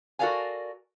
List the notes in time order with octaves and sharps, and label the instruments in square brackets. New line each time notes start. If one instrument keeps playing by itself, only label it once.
[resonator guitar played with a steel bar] F#4 A4 A#4 D5 F5 G#5